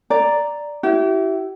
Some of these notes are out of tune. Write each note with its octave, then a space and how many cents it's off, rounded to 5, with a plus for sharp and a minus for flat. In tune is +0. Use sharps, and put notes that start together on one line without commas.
D5 +0 A#5 +0
E4 +0 G4 -40